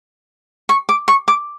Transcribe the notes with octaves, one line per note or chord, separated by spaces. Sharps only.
C#6
D6
C#6
D6